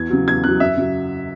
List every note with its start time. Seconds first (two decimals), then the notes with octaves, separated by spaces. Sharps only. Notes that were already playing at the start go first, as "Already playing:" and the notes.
Already playing: E2 G#6
0.10 C#3 F#3
0.28 E2 G#6
0.44 C#3 F#3 F#6
0.60 F#2 E5
0.77 C#3 F#3